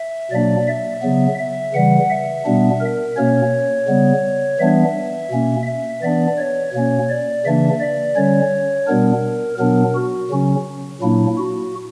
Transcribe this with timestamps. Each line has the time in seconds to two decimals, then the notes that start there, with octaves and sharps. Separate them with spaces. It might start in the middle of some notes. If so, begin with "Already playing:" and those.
Already playing: E5
0.31 B2 F#3 A#3 D4 D5
0.67 E5
1.02 C#3 F#3 B3
1.38 E5
1.74 C#3 E3 G3 F#5
2.10 E5
2.46 B2 G3 B3 D4
2.80 A#4
3.17 B2 A#3 C#4 C#5
3.88 C#3 G3 B3
4.59 E3 G3 B3 D4 E5
5.31 B2 A#3 C#4
5.66 E5
6.02 E3 B3 D4 D5
6.38 C#5
6.74 B2 A#3 C#4 C#5
7.09 D5
7.45 C#3 E3 A#3 D4 E5
7.80 D5
8.16 D3 G3 C#4 C#5
8.88 B2 G3 B3 D4 A#4
9.59 B2 F#3 B3 D4 A#4
9.95 F#4
10.31 C#3 F#3 C#4
11.01 A#2 F#3 A#3 D4 E4
11.37 F#4